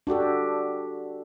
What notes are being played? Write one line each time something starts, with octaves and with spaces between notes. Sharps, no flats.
D4 F#4 G4 A4